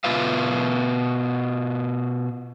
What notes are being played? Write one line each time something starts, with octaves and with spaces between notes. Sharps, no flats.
B2 F4 B4 E5 F5